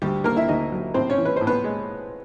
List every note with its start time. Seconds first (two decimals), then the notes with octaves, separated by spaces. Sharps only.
0.02 D2 G3 G4
0.24 D3 A#3 A#4
0.36 E4 E5
0.48 D2 D#4 D#5
0.72 F#3
0.94 A2 C4 C5
1.10 C#4 C#5
1.18 E3
1.25 B4
1.36 A2 C5
1.47 B3 B4
1.64 G#3